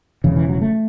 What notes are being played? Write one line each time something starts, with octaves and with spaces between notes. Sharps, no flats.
E1 E2 C#3 E3
E3
F#3
A3